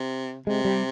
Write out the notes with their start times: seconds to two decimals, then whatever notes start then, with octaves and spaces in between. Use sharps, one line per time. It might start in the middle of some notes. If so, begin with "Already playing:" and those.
Already playing: C3
0.46 C3 G#3
0.65 G3